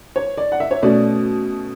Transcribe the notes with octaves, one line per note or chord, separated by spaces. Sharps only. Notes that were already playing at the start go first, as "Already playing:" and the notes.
C#5
D5
F#5
E5
C#5
B2 A3 C#4 D5